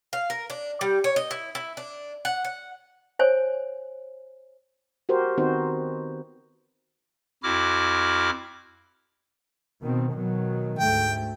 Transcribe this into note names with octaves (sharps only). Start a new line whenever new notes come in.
F5
A#4
D4
G3
C#5
D#5
E4
E4
D4
F#5
F#5
C5 C#5 G#5
F#4 G4 A#4 C5
D#3 B3 C4 D#4 F#4 C5
F2 E4 F#4 D6 F6
B2 D#3 C4
B2 D#3 F#3
D2 G#2 A3 G5